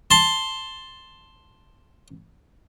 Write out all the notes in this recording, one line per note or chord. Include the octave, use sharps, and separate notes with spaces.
A5 C6